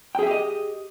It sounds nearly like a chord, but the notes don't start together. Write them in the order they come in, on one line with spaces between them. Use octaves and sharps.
G5 G#4 E5 G4 D#5